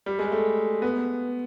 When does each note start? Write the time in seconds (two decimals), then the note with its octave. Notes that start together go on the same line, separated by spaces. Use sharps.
0.06 G3
0.19 G#3
0.32 A3
0.82 B3